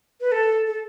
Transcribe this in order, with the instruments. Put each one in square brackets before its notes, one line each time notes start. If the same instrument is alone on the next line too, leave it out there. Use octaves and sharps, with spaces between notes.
[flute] B4
A4
A4